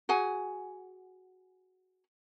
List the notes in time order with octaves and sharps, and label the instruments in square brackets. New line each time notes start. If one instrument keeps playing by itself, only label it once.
[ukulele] F#4 G#4 F#5 G#5